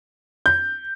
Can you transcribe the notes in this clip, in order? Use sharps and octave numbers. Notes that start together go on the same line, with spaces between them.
G6